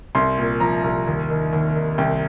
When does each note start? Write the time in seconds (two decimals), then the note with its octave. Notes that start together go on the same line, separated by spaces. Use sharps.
0.15 C2 C6
0.38 A#2
0.60 F3 A#5
0.84 C2
1.07 D#2
1.30 D#3
1.53 D#2
1.76 D#3
1.98 C2 G5